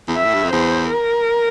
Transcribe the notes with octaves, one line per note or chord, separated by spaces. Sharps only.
E2
F2 E5
A2
G2
F2
E2 C5
A#4